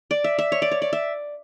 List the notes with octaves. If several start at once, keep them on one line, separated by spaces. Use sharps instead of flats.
D5
E5
E5
C#5
D5
C#5
D5
E5